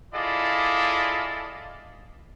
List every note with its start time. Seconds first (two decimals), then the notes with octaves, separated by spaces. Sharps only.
0.14 E4 F4 G#4 A4 D5 D#5